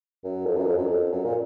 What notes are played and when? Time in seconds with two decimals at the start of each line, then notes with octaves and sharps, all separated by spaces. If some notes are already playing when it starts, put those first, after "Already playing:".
0.24 F#2
0.46 F2
0.57 F#2
0.67 F2
0.78 F#2
0.87 F2
1.12 F#2
1.24 A#2